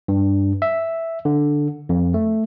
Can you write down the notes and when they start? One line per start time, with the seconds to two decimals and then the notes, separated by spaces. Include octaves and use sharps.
0.08 G2
0.62 E5
1.25 D3
1.89 F2
2.14 A3